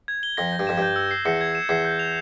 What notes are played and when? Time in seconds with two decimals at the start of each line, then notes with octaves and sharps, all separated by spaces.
0.08 G#6
0.23 G7
0.37 F2 A#6
0.52 G6
0.59 G2
0.67 F2 E7
0.78 G2 G6
0.96 E6
1.11 C7
1.26 E2 C#7
1.41 G#6
1.55 E7
1.69 E2 C7
1.85 G6
1.99 F7